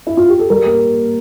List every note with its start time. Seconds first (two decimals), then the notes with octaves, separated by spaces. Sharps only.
0.07 E4
0.17 F4
0.29 G4
0.39 A4
0.50 G3 A#4
0.66 A#3